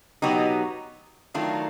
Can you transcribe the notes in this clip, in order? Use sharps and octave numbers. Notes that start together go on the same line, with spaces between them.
B2 F#3 B3 D#4 G4
D#3 F#3 A3 D4 F4